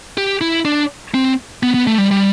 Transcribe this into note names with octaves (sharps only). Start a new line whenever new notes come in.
G4
E4
D4
C4
B3
B3
A3
G3
G3